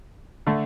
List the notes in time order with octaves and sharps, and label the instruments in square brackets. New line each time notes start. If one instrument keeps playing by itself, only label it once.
[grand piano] D3 A3